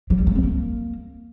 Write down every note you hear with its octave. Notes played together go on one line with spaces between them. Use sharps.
F#3
G3
A3
C4
A#3